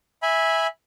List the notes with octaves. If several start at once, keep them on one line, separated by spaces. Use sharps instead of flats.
E5 G#5 B5